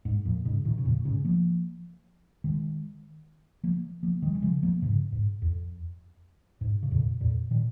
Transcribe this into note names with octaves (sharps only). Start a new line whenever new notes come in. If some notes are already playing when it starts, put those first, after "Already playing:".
G#2
F2 A#2
G#2 C#3
A#2 D#3
C#3
F2 A#2
G#2 C#3
F3 A#3
D#3 G#3
F3 A#3
F3 A#3
D#3 G#3
G#3
C#3 F3
F3 A#3
G#2 C#3
G#2
F2
G#2
C#3
F2 A#2
F2 A#2
A#2 D#3